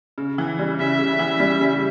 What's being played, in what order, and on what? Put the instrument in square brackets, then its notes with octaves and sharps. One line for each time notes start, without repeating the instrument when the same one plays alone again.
[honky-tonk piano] C#3
E3
G3
[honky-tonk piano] C#3 [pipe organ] E5
[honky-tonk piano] C#3
E3
G3
C#3